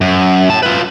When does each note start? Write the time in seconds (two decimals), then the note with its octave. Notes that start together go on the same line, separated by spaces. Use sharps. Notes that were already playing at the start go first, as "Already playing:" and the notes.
0.01 F#2
0.49 A2 A5
0.63 F4 B4